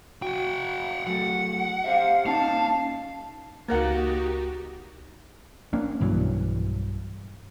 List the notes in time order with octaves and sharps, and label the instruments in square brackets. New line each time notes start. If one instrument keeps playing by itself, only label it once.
[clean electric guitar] F#4 [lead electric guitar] F#5 G5
[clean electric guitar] F#3 A3 [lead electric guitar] F#5
[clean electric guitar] G4 C5 E5 [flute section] F5
[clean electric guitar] A#3 C#4 D#4 [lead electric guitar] F5 [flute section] A5
[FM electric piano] C#2 A6 [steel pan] A#3 A#4 F#5 [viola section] D#4 F#4 G4
[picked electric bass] A#3 C#4 D4
B1 G2 E3 F#3